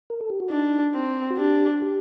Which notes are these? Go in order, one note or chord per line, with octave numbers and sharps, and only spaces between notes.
A#4
A4
G4
F#4
D4 D#4
C4
F#4
D4 G4
G4